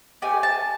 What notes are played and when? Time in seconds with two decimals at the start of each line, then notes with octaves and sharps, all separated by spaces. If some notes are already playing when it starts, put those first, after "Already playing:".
0.22 A3 D4 G4 G#5
0.43 A5